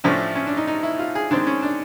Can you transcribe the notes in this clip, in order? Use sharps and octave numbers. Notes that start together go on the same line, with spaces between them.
A2 F3 A3 C#4 D4
C#4
D4
D#4
D#4
E4
F4
G#4
D#3 G#3 C4 D4
C#4
D4